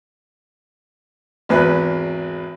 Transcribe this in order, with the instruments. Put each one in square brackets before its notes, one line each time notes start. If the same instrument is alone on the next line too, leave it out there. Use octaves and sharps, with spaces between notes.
[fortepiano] G#1 E2 B4